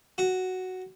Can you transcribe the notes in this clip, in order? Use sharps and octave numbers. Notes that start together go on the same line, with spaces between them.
F#4